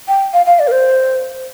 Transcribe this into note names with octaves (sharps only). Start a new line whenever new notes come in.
G5
F5
F5
D5
A#4
C5